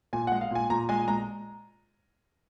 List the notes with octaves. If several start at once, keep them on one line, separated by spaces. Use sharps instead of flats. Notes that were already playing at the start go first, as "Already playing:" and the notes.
A#2 G#5
G#3 F#5
F5
A#2 G#5
A#2 A#5
G#3 G#5
G#3 A#5